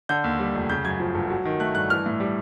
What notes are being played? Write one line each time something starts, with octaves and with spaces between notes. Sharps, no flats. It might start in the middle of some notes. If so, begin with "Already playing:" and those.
D3 G6
D#2
G3
F1
C#3 G6
F#2 G#6
F3
G1
F#3
D#3
A3 F#6
G2 F#6
E3 F6
A2
G3